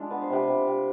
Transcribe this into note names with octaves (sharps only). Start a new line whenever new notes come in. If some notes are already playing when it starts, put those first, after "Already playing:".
Already playing: G#3 D4 F4
B3 B4
C5
C3 G4 B4
C3
C3